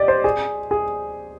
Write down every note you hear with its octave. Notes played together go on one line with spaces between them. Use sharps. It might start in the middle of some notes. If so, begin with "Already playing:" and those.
Already playing: G4 D5 D#5
C5
G#4
G#4